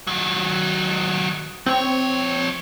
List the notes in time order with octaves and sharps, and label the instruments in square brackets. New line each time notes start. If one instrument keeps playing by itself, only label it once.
[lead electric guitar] D#3 F#3
[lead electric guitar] F3 C#5 [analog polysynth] C4